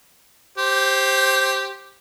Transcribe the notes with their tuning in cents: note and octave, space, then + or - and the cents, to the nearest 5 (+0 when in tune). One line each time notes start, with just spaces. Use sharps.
G4 -5 C5 +10